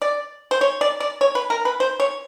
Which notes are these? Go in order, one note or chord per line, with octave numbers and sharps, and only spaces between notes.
D5
C5
C#5
D5
D5
C#5
B4
A#4
B4
C5
C#5